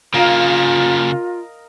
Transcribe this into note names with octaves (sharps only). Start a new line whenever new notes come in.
C#3 A#3 F4 A#4 D#5 F5